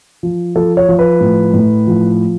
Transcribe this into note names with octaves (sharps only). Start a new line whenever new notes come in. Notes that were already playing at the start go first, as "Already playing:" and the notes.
F3
F3 A4
C#5
F3
B4
A2
A2
F3